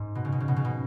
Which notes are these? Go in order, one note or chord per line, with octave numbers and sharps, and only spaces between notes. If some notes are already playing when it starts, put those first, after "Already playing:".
Already playing: G#2
B2
C#3
B2
C#3
B2
C#3
B2